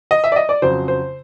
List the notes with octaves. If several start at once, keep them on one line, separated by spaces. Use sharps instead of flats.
D#5
E5
D5
D#5
D5
F2 C#3 F#3 C5
C5